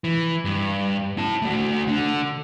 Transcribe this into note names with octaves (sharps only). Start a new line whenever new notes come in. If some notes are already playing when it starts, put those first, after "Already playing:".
E3
G2
E4 A5
A3 F#4
D3